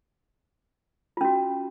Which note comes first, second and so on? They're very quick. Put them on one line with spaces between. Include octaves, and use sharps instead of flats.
F4 C#4 F#4